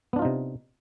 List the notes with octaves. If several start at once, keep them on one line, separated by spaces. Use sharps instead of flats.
C3 B3 D4 D#4 F4